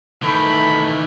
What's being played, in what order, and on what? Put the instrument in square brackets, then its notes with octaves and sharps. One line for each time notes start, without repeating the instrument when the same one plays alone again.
[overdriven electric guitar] D#3 E3 [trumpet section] A3 B5